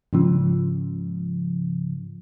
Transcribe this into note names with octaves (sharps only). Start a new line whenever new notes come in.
G#2 C#3 F3